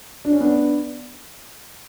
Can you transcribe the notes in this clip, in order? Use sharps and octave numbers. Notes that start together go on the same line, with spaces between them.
D4
C#4
B3 D4